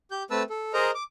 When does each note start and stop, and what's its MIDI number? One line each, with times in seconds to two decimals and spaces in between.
0.11 0.23 67
0.11 0.23 91
0.31 0.43 57
0.31 0.43 60
0.31 0.43 71
0.31 0.43 81
0.31 0.43 88
0.50 0.72 69
0.73 0.91 68
0.73 0.91 70
0.73 0.91 72
0.73 0.91 75
0.73 0.91 82
0.95 1.03 86